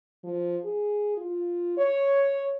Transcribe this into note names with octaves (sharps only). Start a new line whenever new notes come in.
F3
G#4
F4
C#5